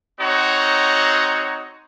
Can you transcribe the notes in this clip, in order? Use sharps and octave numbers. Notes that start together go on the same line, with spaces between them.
C4 D#4 F#4 C#5